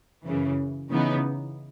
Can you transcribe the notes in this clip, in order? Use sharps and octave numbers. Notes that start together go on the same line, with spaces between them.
F#2 C#3 E3
C#3 E3 B3 D#4